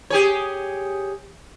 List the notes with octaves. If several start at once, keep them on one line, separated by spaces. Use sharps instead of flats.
G4 G#4 C#5